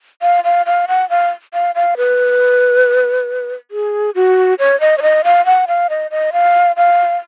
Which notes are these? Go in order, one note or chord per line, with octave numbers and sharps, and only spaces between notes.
F5
F5
F5
F#5
F5
F5
F5
B4
G#4
F#4
C#5
D#5
C#5
D#5
F5
F#5
F5
D#5
D#5
F5
F5